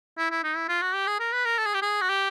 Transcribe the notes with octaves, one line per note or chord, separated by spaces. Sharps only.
E4
E4
D#4
E4
F4
F#4
G4
G#4
A#4
B4
A#4
A4
G#4
G4
G#4
F#4
G4